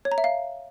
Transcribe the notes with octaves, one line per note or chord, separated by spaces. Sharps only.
C#5
A#5
E5
F5